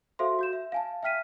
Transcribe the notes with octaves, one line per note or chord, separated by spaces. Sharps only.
F#4 A4 C5 E5 F5 C6
F#4 G6 E7
E5
F5 G#5 A5
E5 G5 F6 B6 D#7